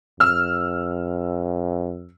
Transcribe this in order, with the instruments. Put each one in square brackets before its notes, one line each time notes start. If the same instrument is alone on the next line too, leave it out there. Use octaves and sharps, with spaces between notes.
[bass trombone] F2 [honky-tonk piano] E6 F6